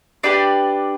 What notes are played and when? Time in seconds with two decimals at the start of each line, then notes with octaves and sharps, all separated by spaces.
0.23 D4 G4 B4 D5